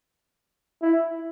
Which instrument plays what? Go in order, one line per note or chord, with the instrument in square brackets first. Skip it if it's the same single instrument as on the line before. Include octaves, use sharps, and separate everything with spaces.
[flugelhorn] E4